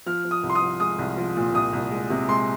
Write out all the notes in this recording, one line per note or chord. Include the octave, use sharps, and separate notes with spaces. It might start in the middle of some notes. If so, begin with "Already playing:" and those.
F3 F6
F3
D#6
C2
C6
D#6
F3
G#3 D#6
C2
F3
A#2
C2 D#6
C2
G#3
C3
G#3 C6